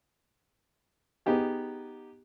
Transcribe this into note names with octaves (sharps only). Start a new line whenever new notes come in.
B3 D#4 G4 G#4